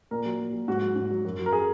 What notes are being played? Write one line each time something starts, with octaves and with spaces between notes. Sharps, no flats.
A#2 A#4
F#3
A#2
F#3
G#2 F#4
F#3
G#2
F#3
F#2
F#3
A#4
G#4